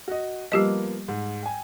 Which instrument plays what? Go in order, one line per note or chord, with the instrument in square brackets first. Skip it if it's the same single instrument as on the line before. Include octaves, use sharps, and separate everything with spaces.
[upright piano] F#4 D#5
[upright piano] F3 A#3 B3 [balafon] G3 G4 D#5
[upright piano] G#2
G5 G#5